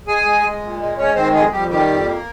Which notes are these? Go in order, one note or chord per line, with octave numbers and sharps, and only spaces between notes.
G#3 G#4 G#5
G#3
G#3
A#2
G#3
G#3 C#4 C#5
D#3 C4 C5
F2 G#3 G#4
F2 G3 G4
D#3 G3 G4
F2
A#3